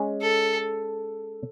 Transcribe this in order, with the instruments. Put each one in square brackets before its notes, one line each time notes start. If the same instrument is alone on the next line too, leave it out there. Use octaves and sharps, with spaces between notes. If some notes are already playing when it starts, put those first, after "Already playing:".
Already playing: [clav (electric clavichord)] G#3 C#4
[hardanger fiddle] A4